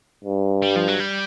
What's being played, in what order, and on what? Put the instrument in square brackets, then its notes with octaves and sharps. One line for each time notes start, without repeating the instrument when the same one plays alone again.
[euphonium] G2
[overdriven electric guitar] G3
F3
F#3
G3